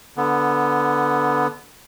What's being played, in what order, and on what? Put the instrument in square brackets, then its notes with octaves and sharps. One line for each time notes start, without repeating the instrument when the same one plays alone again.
[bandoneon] D3 B3